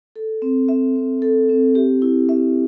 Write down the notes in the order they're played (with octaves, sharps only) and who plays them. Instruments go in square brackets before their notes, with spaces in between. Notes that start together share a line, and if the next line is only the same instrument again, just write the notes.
[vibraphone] A4
C4
E5
C4
A4
C4
G4
E4
E5